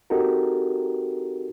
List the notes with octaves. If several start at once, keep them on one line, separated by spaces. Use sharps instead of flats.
C4 D#4 F#4 G4 A4 A#4